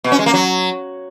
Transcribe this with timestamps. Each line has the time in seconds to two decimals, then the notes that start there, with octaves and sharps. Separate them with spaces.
0.04 B2
0.12 C#4
0.19 G#3
0.26 A#3
0.34 F#3